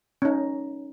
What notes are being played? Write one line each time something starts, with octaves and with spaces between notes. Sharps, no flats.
C#4 D#4